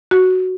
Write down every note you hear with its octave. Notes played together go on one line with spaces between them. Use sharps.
F#4